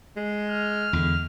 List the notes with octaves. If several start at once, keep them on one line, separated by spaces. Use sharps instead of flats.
G#3
F6
E2 D3